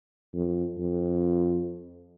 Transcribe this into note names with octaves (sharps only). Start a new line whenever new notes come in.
F2
F2